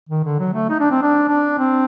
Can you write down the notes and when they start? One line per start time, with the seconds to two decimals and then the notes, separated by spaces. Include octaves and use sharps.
0.09 D#3
0.24 D3
0.39 F#3
0.53 A3
0.69 D#4
0.80 D4
0.91 C4
1.02 D4
1.28 D4
1.58 C4